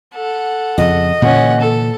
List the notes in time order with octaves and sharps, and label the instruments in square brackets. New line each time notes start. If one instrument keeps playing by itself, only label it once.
[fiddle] A4 F#5
[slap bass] F2 C#3 [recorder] D#5
[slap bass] A#2 D3 E3 [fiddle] C#4 F#5
[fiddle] A4